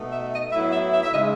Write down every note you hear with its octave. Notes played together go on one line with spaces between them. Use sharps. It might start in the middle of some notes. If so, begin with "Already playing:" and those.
Already playing: B2 A3 D#4
E5
D#5
A2 F#3 B3 E4 E5
E5
E5
E5
C#3 G#3 D#4 D#5